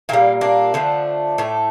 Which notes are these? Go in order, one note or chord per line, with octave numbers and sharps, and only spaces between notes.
A#2 G3 A#3
A#3 D4
D3 F3 A3
A2 A3